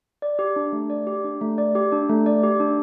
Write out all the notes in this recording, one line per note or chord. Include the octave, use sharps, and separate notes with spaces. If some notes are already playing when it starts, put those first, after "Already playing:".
D5
G4
D4
A3
D5
G4
D4
A3
D5
G4
D4
A3
D5
G4
D4